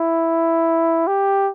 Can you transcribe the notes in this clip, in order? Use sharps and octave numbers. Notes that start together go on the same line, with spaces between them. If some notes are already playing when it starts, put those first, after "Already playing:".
Already playing: E4
G4